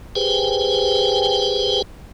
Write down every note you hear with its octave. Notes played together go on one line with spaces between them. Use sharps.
G4 G#4 B4 C5 G5 G#5